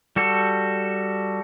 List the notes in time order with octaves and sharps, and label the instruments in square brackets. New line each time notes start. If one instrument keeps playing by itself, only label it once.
[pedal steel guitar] G3 F#4 A4